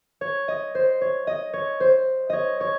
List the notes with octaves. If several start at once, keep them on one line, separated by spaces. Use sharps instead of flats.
C#5
D#5
C5
C#5
D#5
C#5
C5
C#5 D#5
C#5